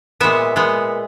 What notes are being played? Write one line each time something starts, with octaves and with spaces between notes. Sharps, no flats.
A#2 G#3 B3 E5
A#2 G#3 B3